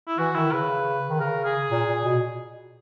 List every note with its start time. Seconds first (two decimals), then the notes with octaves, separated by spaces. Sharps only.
0.08 E4
0.18 E3 F#4
0.35 D#3 E4
0.52 C#3 B4
1.09 D#3
1.20 C#3 A#4
1.45 G#4
1.71 A#2
1.88 A#2
2.05 B2